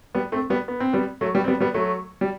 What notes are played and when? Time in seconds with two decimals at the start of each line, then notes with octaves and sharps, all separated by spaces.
0.15 G3 B3
0.32 A3 C4
0.50 G3 B3
0.68 B3
0.80 C4
0.93 G3 B3
1.21 F#3 A3
1.34 G3 B3
1.44 C4
1.48 G3 B3
1.61 G3 B3
1.74 F#3 A3
2.21 G3